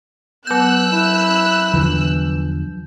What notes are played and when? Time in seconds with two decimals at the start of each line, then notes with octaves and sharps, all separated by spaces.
0.47 F#3 B3 E6 F#6 G6
0.92 E4
1.74 E2 D3 E3 F3